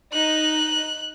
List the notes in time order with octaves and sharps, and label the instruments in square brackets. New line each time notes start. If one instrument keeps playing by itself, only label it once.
[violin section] D#4 [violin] F#6